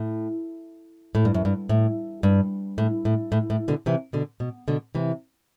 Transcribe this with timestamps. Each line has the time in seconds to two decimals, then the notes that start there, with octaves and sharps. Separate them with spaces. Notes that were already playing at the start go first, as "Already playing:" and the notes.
Already playing: A2
1.15 A2
1.25 G2
1.34 F#2
1.45 G2
1.69 A2
2.23 G2
2.78 A2
3.05 A2
3.32 A2
3.50 A2
3.68 B2 D3
3.86 C3 E3
4.13 B2 D3
4.40 B2
4.68 B2 D3
4.95 C3 E3